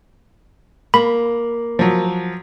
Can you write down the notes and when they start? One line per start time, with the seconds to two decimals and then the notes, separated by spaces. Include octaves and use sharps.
0.94 A#3 B5
1.79 F3 F#3